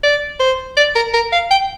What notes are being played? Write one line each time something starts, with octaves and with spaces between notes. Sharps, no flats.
D5
C5
D5
A#4
A#4
F5
G5